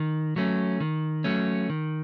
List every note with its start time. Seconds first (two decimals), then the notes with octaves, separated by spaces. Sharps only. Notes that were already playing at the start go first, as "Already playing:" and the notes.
Already playing: D#3
0.36 F#3 A3 C#4
0.80 D#3
1.24 F#3 A3 C#4
1.70 D#3